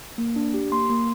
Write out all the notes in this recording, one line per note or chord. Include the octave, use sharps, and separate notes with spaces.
A#3
D4
G4
A#3 C6
A#3